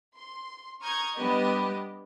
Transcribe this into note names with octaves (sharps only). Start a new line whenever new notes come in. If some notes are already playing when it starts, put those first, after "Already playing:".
C6
A#5 C#6 D#6 F6 G6 G#6
G3 B3 D4 G4 D#5